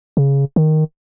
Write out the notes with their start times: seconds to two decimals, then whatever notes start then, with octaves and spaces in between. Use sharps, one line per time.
0.17 C#3
0.56 D#3